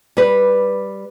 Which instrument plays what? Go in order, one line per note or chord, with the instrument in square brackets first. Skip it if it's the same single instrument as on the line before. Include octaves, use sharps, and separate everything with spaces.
[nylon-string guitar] G3 B4